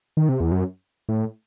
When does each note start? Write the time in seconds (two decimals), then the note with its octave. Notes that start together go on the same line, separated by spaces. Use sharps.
0.17 D#3
0.29 C3
0.40 E2
0.52 F#2
1.09 A2